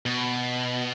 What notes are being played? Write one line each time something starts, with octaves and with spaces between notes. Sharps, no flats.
B2